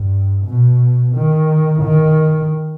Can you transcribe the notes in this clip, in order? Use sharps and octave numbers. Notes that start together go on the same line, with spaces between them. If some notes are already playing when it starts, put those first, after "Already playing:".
Already playing: G2
B2
D#3
D#3